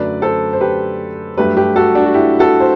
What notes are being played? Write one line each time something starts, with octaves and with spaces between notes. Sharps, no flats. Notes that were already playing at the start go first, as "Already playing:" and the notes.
Already playing: F#2 D3 F#3 A3 B4 D5
A4 C5
C5
G4 B4
G2 F#3 A3 G4 B4
G4 B4
F#4 A4
D4 F#4
F#4
E4 G4
F#4 A4
C5